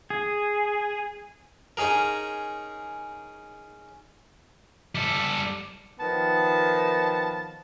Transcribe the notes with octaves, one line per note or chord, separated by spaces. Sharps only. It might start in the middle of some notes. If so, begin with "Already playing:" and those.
G#4
C#4 D#4 G#4 A#4
G3 A4
D#3 F3 B3 A5